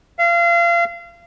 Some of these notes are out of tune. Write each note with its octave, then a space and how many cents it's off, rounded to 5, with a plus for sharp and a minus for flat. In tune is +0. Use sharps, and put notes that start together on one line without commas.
F5 -30